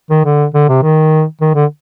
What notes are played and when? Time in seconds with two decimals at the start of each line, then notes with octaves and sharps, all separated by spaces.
0.11 D#3
0.25 D3
0.54 D3
0.69 C3
0.83 D#3
1.41 D#3
1.55 D3